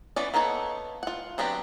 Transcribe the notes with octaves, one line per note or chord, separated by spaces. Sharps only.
E3 B3 C#4 D5
A#3 B3 D#4 A4 C#5
F4 F#5
F#3 B3 C4 D4 G4